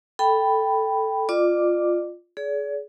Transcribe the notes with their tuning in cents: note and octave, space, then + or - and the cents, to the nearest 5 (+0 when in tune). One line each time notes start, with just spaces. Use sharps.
A4 +0 G5 +0 B5 +0
F4 +0 D5 +40 D6 +0
G#4 +25 D5 -40